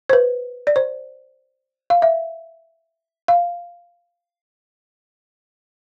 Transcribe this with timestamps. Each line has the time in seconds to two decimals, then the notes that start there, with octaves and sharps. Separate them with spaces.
0.09 C5
0.13 B4
0.67 D5
0.76 C5
1.90 F5
2.02 E5
3.28 F5